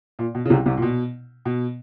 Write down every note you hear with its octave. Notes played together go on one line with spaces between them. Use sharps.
A#2
B2
C#3
C2 C3
C2 C3
A#2
B2
B2